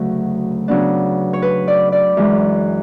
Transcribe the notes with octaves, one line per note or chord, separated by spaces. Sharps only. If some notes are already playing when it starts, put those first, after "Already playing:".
Already playing: D2 C#3 F#3 A3 C#4
C#3 F#3 B3 D4
C#5
B4
D5
D5
F#2 E3 G#3